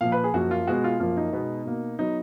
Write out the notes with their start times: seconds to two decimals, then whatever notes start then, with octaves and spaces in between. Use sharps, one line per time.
0.01 A#2 F3 A#3 F5
0.12 B4
0.24 G#4
0.34 F#2 F3 A#3 F#4
0.51 F4
0.67 B2 G#3 B3 F#4
0.84 F4
1.00 F#2 F3 A#3 F4
1.17 D#4
1.33 B2 G#3 B3
1.65 B2 A#3
1.99 F#3 B3 D#4